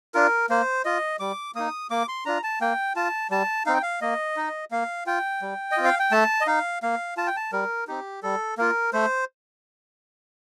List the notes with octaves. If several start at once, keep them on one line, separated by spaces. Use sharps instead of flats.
D4 F4 A#4
A#3 C5
F4 D#5
G3 D6
A#3 D#4 D#6
A#3 D6
C6
D4 F4 A#5
A5
A#3 G5
F4 A5
G3 A5
C4 D#4 F5
G5
F5
A#3 D#5
D#4
A#3 F5
F4 G5
G3
D#5
C4 F4
F5
G5
A3 A5
D#5
D#4 F5
A#3 F5
F4 A5
G5
A5
G3 A#4
C4 D#4 G4
G3 A4
A#3 F4 A#4
A3 C5